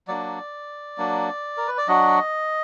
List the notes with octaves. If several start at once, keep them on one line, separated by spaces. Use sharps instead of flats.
F#3 A#3 D4 D5
F#3 A#3 D4
A#4
B4
D5
F#3 D4 F#4 D#5